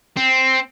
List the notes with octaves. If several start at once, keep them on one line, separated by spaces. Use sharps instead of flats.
C4